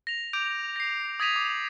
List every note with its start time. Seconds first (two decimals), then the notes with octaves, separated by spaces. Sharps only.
0.07 A#6 F7
0.33 D6 G6 D7 F7
0.76 A#6 C7
1.20 D#6 G#6 A#6 B6 D#7 F7
1.36 D6